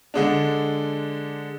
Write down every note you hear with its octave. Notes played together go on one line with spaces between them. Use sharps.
D3 G#3 D4